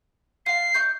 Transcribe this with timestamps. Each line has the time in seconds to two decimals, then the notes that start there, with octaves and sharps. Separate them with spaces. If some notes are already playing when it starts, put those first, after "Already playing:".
0.46 F4 F5 C7
0.74 D#4 C#6 G6